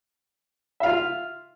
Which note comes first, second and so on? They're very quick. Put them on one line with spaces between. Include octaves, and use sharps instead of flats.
E5 F5 F4